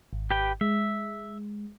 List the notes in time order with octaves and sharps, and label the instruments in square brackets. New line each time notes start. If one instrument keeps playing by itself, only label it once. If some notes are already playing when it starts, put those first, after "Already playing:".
[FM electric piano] G#1
[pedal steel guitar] G4 B4 G5
[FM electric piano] G#3 [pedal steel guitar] E5